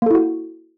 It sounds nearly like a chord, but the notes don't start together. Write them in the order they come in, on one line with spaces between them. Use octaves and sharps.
A#3 A4 E4 F#4